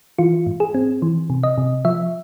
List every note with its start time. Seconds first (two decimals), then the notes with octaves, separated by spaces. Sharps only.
0.18 E3 F4
0.46 G#2
0.60 G#4
0.74 C4
1.02 E3
1.30 C3
1.43 D#5
1.58 C3
1.85 F3 E5